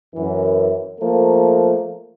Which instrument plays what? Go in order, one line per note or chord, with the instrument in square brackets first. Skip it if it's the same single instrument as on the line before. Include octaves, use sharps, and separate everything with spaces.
[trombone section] F#2 E3
F3 A3 A#3